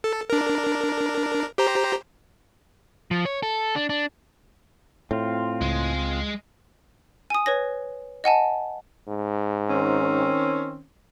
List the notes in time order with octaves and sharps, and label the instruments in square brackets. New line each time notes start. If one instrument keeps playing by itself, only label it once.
[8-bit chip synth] A4
D4 A#4
G4 C5 A#5
[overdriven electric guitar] F3
C#5
A4
D4
D4
[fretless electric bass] A2 [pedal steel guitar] C4 F4
[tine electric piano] C#2 [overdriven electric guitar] G#3
[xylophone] G#5 D#6
B4 C#5 A#6
D#5 F#5 G#5 A5
[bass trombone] G#2
[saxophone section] D#3 C4 C#4